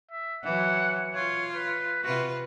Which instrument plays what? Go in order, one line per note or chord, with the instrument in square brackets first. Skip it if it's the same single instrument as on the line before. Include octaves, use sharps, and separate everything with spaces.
[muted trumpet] E5
[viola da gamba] E3 F#3 [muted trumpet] F#5
[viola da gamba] F4 [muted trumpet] C#5
[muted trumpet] B4
[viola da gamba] C3 F4 B4 [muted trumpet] F#4